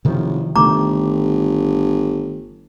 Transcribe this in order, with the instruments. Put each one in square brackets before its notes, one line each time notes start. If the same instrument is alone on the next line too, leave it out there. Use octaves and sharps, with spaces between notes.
[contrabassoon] F#1 [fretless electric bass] C3 D#3 F3
[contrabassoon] G1 [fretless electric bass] D#3 A3 [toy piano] A#5 D6